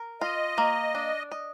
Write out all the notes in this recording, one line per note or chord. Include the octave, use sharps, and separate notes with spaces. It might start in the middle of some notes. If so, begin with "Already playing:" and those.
Already playing: A#4
F4 D#5
A#3
D4
D#5